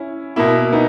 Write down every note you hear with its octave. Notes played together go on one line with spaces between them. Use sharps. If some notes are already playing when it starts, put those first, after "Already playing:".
Already playing: C#4 E4
B2 A#3 E4
B3 D#4